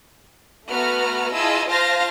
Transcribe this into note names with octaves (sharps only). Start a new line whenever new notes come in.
A3 B3 F#4 B4 A#5 F6
E4 F4 G#4 D#5 A5 E6
F4 C5 F5 A5 F6 A#6